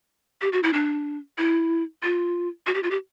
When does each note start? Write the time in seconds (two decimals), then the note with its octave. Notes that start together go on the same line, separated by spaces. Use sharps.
0.41 G4
0.52 F#4
0.63 E4
0.73 D4
1.38 E4
2.03 F4
2.67 F#4
2.74 G4
2.83 F4
2.91 G4